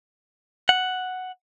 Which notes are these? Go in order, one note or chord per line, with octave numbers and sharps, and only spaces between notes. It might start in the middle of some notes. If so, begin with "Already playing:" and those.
F#5